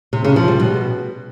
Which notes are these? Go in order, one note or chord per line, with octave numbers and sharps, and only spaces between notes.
C3
C#3
F3
G3
B2